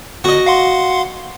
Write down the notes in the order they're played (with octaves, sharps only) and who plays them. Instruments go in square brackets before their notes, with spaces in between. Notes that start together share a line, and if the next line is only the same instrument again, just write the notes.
[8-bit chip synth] G1 [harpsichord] F#4 D#5
[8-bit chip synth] F5 F#5 C6